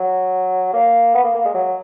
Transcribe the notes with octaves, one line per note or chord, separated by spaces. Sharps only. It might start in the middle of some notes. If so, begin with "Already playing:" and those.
Already playing: F#3
A#3
B3
A#3
A#3
G#3
F#3